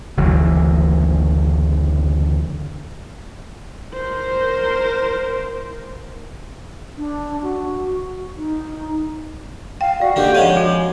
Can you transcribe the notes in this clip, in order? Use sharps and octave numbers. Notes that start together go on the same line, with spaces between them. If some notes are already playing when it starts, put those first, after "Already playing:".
F#1 D2 E3 F#3
A#4 C5
D4
F#4
D#4
F5 G5
F#4 D5
D3 D#3 A#3 G4
F2 G#3 C#5 F5 F#5
F#4
G#5